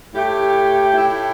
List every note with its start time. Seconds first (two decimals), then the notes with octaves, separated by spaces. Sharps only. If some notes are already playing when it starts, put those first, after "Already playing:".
0.13 A2 A3 G4
0.93 A2 A3 E4 G4